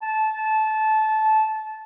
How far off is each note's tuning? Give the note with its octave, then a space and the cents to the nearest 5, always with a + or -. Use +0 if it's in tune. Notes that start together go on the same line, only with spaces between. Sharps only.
A5 -20